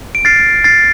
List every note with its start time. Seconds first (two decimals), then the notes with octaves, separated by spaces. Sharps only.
0.15 D7
0.25 F6 A6 C7
0.45 F6
0.64 F6 A6 C7